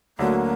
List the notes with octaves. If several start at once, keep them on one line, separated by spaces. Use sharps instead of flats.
D2 D3 F#3 A#3